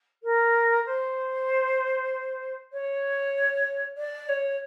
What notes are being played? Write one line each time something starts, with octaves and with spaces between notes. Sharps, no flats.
A#4
C5
C#5
D5
C#5